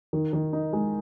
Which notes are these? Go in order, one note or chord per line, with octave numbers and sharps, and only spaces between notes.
D#3
D#3
D#4
G#3